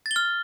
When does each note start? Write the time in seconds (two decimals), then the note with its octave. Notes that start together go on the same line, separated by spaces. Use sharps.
0.06 A6
0.11 G7
0.16 F6